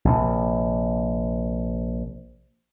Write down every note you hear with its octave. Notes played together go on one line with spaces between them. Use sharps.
A#1 C3